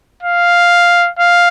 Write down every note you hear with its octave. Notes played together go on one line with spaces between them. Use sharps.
F5
F5